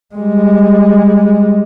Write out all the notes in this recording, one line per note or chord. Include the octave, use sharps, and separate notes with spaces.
G3 G#3